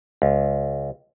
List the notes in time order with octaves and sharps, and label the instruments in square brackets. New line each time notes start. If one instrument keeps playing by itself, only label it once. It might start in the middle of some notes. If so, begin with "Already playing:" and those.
[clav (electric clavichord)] C#2